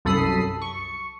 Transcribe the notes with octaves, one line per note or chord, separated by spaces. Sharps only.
C2 F#2 A4 B5 D#6 C7
C#6